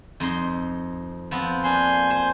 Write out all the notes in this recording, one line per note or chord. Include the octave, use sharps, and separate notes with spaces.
F2 D#4 C6
F3 B3 C4
A#3 D4 G#5 C6 G6
C5